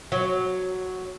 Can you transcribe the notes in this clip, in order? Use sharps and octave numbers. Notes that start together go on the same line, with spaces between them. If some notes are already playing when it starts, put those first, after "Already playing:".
F#3